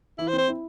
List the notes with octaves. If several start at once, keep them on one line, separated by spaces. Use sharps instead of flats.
E3 E4
C5
C4
C5
E4